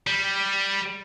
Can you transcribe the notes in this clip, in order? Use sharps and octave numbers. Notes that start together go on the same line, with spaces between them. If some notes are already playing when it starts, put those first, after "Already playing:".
G3